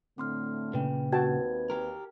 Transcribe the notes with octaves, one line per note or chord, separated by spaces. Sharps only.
A2 D3 A3 C4 C6 F6
A#2 C#3 B4 G5
D#2 C4 F#4 B4 G5 A5 G#6
G4 A#4